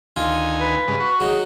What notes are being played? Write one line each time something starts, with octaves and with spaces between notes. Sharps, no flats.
D2 D#3 F4 G#5
B4
G2 C#3 G#3
F#4 C#6
F#3 D#4 G#4